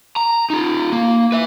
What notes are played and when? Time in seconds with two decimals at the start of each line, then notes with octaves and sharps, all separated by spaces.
0.16 A#5
0.50 D#4 F4
0.92 A#3
1.32 B4 E5